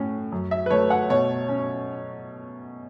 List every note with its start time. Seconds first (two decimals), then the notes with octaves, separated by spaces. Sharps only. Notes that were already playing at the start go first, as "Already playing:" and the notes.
Already playing: A2 C#4
0.32 F#2
0.51 E5
0.66 B4
0.70 A3 C#5
0.90 F#5
1.10 B2 C#5
1.49 C#4